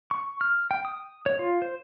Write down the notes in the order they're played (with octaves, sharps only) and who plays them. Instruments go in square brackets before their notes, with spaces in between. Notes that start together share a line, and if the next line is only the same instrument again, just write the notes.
[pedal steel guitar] C#6
F6
G5
D#6
C#5
F4
C5